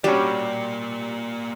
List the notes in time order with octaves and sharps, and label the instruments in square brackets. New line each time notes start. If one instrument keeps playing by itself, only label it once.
[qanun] G3 F#4 [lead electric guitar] A#3 D5 [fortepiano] C#4 D4 [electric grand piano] G4